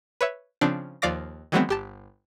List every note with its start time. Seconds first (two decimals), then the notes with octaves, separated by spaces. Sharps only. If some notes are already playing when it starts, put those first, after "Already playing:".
0.21 B4 C#5 E5
0.61 C#3 F3 C4 D4
1.02 D#2 F3 D5 F5 D6 A#6
1.52 D#3 E3 F#3 G#3 B3 C4
1.69 G1 G4 A5